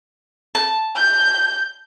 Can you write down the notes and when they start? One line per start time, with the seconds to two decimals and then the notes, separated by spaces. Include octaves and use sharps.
0.55 A5
0.96 G6